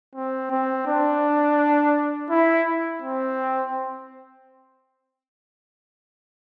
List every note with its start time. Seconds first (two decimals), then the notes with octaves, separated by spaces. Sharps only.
0.15 C4
0.50 C4
0.86 D4
2.30 E4
3.02 C4